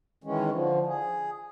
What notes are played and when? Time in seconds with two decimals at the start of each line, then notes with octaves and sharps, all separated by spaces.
0.24 D#3 E3 G#3 C#4
0.51 D3 F3
0.86 G#4